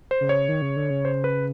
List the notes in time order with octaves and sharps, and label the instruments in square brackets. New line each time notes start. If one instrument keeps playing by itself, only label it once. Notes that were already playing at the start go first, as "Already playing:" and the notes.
[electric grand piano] C5
[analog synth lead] C#3
[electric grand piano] C#5
[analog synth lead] D#3
C#3
D3
C#3
[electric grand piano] C5
B4